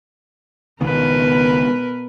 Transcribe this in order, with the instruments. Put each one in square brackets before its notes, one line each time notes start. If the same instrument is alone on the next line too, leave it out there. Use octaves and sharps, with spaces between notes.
[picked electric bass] C#2 D#3 B3 [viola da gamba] B2 A#4 B4